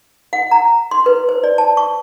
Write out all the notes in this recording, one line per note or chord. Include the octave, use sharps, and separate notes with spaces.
F#5
A#5
C6
B4
C5
D5
A5
C#6